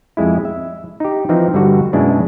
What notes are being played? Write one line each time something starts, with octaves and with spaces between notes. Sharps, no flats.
F2 G#3 E4
E5
D#4 G4
E3 F3 C4 D#4
G2 D3 G3 F#4
F#2 B2 G#3 D4 E4